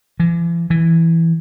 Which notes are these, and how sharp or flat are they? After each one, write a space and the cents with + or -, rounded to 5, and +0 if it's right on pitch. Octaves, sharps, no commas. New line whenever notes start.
E3 +45
E3 +5